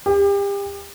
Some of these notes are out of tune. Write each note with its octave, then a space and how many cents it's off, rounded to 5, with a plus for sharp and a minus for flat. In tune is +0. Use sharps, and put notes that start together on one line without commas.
G4 +35